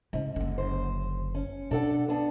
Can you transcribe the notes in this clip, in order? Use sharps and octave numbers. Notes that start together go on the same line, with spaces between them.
G#2 C#3
F#1 D3
C5
C#4
B2 D4 A4 F#5
B3 D4 A4